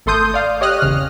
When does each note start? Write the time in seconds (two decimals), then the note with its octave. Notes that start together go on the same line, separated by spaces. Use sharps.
0.06 G#1 A3 A4 C6 D#6 G6
0.34 D5 F5
0.61 G4 C#5 D#5 D#6 F6 F#6
0.81 G#1 E2 C#3 F6